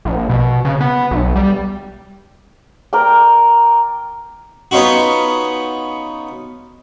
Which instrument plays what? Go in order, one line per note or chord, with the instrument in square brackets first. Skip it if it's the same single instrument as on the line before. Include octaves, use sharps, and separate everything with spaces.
[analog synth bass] A#1
B2
C#3
B3
B1
G3
[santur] A#4 D5 G5
[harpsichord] B3 C#4 D#4 F4 F#4